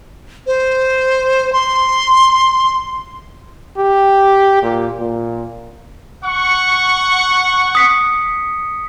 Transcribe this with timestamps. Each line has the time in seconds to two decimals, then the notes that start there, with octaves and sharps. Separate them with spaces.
0.47 C5
1.53 C6
3.77 G4
4.63 A#2
5.00 A#2
6.25 F#5 C#6
7.75 D#6 B6 C#7